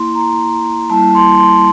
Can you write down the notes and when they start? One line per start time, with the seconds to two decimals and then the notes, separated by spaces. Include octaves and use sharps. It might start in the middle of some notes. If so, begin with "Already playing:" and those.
Already playing: A#3 E4 C6
0.15 A#5
0.90 G3 A#3 E4 A5
1.15 C6
1.38 C6